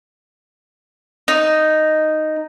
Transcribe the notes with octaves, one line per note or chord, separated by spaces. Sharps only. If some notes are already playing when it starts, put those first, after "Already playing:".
D#4